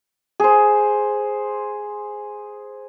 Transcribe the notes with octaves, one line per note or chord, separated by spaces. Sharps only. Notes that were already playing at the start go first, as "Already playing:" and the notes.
G#4 C5